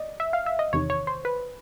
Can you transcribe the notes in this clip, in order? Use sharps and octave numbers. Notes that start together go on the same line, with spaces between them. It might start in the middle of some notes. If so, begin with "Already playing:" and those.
Already playing: D5 D#5
E5
F5
E5
D#5
E2 C3 D#3 C#5
C#5
C5
B4